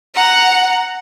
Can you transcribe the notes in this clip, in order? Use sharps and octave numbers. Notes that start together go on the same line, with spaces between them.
F#5 A#5